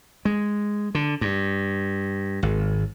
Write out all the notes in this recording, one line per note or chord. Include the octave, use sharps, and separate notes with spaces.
G#3
D3
G2
G#1